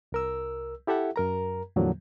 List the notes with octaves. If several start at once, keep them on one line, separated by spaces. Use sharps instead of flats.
C2 A#4 E6
E4 G4 A4 E5 F#5
F#2 A#4 A#5
E2 A2 D3 F3 F#3 A#3